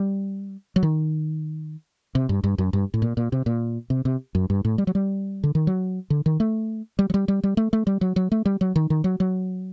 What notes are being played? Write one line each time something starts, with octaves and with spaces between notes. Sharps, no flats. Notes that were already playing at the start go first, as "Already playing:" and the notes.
Already playing: G3
F#3
D#3
C3
G2
G2
F#2
G2
A2
A#2
A#2
C3
A#2
C3
C3
F#2
G2
A2
G3
F#3
G3
D3
D#3
F#3
D3
D#3
A3
G3
F#3
G3
G3
G3
A3
A3
G3
F#3
F#3
A3
G3
F#3
D#3
D#3
F#3
F#3